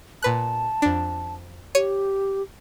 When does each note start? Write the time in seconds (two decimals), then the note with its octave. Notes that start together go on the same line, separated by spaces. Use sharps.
0.23 A#2 B4 A5 F#6
0.82 F2 D4
1.75 G4 C#5 C#7 D#7